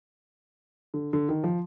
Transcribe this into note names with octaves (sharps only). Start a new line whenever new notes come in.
D3
D3
D#3
F3